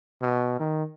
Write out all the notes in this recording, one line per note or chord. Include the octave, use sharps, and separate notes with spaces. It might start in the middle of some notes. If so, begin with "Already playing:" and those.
B2
D#3